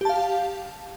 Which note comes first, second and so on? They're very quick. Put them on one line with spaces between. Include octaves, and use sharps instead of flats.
G4 A5 F5